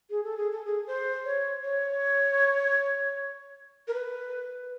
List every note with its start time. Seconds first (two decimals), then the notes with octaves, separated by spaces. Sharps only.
0.10 G#4
0.24 A4
0.37 G#4
0.52 A4
0.65 G#4
0.87 C5
1.25 C#5
1.63 C#5
3.88 A#4
3.94 B4